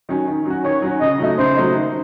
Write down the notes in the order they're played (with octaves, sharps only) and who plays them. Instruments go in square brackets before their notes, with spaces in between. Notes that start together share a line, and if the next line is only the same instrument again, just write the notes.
[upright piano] D#3 F#3 C#4
D#3
F#3 C#4 F#4
[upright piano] D#3 [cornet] C#5
[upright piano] F#3 C#4 F#4
[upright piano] C#3 [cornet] D#5
[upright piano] F#3 A3 D#4
[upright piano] C#3 [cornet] C5
[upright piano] F#3 A3 D#4
D#3